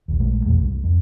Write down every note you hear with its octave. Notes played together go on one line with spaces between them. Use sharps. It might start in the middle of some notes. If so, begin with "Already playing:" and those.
A#1 D#2
A#1 A#2 G#3 A3
A1 E2 B2 A3
C2 G2
F2